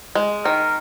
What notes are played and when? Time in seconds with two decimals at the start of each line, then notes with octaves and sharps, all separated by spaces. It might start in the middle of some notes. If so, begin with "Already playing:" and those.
0.15 G#3
0.45 D#3 A#4